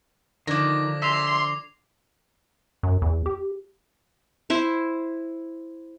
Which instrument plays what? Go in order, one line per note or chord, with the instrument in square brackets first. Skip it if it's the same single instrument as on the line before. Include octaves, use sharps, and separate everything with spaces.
[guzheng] D3 F3 [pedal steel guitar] D#3 [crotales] D6 G#6 A#6
[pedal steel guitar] E5 [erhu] C6 [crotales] A#6 C7 F7
[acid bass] F#2
E2
G4
[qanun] E4 C5